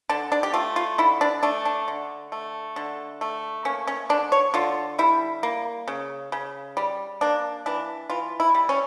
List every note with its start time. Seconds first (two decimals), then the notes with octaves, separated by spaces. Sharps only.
0.09 D3 D4
0.32 D4
0.43 G4
0.54 A3 F4
0.76 F4
0.98 D3 E4
1.21 D4
1.43 A3 D4
1.65 D4
1.88 D3
2.32 A3
2.76 D3
3.21 A3
3.65 A#3 C#4
3.87 C#4
4.09 D3 D4
4.32 C#5
4.54 D3 F4
4.98 G3 E4
5.43 A#3
5.88 C#3
6.32 C#3
6.77 G3
7.21 A#3 D4
7.66 E3 D4
8.10 E3 F4
8.40 E4
8.55 G3
8.69 C#4